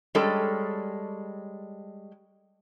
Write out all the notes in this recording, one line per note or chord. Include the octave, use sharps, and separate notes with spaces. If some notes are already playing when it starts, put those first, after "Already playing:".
G3 G#3 C#4 A4